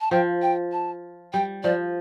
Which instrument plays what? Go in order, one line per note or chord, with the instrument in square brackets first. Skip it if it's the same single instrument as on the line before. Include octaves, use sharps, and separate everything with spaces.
[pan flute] A5
[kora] F3 [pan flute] G5
[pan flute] G5
A5
[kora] G3 [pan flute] G5
[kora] F3 [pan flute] D5